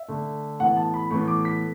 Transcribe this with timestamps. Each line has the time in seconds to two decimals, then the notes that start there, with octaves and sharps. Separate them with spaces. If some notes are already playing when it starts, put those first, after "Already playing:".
Already playing: E5
0.08 D3 A3
0.59 A2 E3 B3 F#5
0.77 A5
0.94 B5
1.11 A2 E3 B3 C#6
1.28 D6
1.45 B6